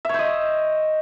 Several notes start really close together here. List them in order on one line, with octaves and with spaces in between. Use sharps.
E5 C#5 C5 D#5